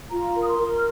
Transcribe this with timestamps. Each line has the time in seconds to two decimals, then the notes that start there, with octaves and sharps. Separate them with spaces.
0.12 F4 A#5
0.35 A#4
0.42 D#6
0.48 C6
0.59 A#4
0.74 F6